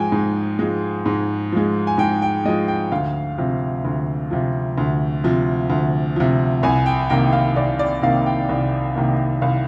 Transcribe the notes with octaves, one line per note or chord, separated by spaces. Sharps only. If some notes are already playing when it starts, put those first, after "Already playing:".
Already playing: G#2 F3 G#3 G5 G#5
G#2
F3 G#3
G#2
F3 G#3
G#5
G#2 G5
G5
F3 G#3 D#5
G5
D2 F5
C3 F3
D2
C3 F3
D2
C3 F3
D2
C3 F3
C2 G#5
G5
C3 D#3 A#3 G5
F5
C2 D5
D5
C3 D#3 A#3 F5
G5
C2
C3 D#3 A#3
C2 F5